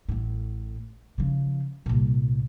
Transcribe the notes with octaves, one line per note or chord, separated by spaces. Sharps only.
A1 A2
C#3 F3
C2 A#2